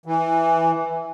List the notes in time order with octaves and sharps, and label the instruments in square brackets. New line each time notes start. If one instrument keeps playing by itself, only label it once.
[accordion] E3